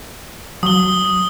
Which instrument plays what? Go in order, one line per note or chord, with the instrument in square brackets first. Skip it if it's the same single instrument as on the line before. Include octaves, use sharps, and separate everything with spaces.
[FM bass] F#3 [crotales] D#6 G7